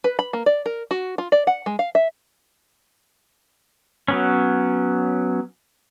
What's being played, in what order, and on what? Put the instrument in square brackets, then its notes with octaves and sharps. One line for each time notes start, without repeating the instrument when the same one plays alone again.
[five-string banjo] B4
B5
A#3
D5
A#4
F#4
F4
D5
F#5
G#3
F5
E5
[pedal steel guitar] F#3 B3 C#4